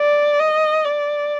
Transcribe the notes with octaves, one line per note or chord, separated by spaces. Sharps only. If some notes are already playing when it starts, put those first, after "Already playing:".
Already playing: D5
D#5
D5